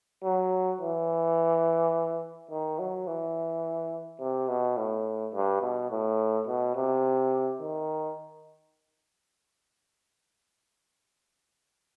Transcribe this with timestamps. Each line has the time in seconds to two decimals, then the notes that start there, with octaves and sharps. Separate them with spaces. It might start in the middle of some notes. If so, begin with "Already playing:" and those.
0.24 F#3
0.81 E3
2.51 D#3
2.79 F#3
3.07 E3
4.20 C3
4.48 B2
4.77 A2
5.34 G2
5.61 B2
5.91 A2
6.47 B2
6.75 C3
7.60 D#3